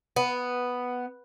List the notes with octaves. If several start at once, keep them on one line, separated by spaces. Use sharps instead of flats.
B3